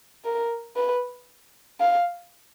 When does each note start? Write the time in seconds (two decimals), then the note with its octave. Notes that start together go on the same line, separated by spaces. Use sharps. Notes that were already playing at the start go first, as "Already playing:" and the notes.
0.24 A#4
0.77 B4
1.80 F5